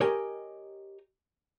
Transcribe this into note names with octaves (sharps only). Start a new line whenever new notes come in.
G4 A#4 C#5 D#5 G5 G#5